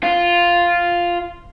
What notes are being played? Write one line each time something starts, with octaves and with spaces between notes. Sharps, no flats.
F4